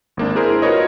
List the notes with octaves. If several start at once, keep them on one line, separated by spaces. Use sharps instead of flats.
G#1 A#3 D4
E4 G#4 A#4 C5
F4 F#4 A#4 B4 C#5 D#5